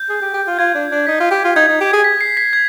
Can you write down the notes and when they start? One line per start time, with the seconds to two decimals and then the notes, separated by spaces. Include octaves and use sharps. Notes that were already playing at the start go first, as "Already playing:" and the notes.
Already playing: G6
0.09 G#4
0.22 G4
0.33 G4
0.47 F4
0.59 F4 G#6
0.75 D4
0.91 D4
1.07 D#4 B6
1.20 F4
1.31 G4
1.44 F4
1.56 D#4 G#6
1.68 D#4
1.81 G4
1.93 G#4
2.04 B6
2.21 C7
2.37 B6
2.53 G#6